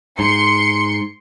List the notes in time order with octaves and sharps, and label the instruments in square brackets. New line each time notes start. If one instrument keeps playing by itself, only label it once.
[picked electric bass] G#2 [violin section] C6 C#7